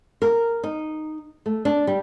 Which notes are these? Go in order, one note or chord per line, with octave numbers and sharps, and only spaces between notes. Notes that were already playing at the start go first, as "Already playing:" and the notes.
A#4
D#4
A3
D4
G3